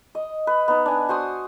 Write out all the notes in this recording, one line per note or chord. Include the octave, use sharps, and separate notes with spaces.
D#5
B4
B3 D#4
D4 G#5
F#4 C5 C6 D#6